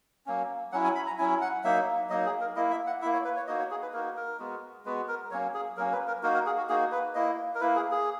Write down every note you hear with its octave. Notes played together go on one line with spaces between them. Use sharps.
F#3 A#3 C#4
F#3 C#4 E4 F#5
G#5
B5
A#5
F#3 C#4 E4 G#5
F#5
F#3 A#3 D#4 E5
F#3 A#3 D#4 D#5
G#4
A#4
A#3 E4 D#5
E5
F#5
A#3 E4 E5
C#5
B4
C#5
A#3 D#4 F#4 D#5
C#5
G#4
B4
A#3 D#4 F#4 A#4
A#4
G#3 B3 F#4
G#3 B3 F#4 B4
A#4
F#3 A#3 C#4 C#5
G#4
F#3 A#3 C#4 A#4
B4
A#4
A#3 D#4 F#4 A#4
A#4
G#4
F#4
A#3 D#4 F#4 G#4
B4
A#3 E4 D#5
A#4
A#3 E4 B4
G#4
G#4